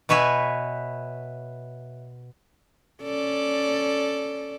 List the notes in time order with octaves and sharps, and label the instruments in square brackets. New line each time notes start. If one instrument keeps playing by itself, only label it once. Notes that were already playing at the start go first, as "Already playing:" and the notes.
[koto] B2 B4 C#5 E5 G#5
[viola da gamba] C#4 A4 D5